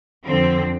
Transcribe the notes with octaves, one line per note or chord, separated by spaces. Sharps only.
F2 D3 F3 C4